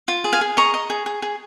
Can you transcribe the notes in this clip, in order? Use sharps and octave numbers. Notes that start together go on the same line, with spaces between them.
F4
G#4
F5 G#5
G#4
D#5 A#5 C#6
D#5
G#4
G#4
G#4